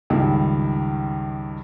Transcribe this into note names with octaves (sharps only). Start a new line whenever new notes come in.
C#2 G2 D#3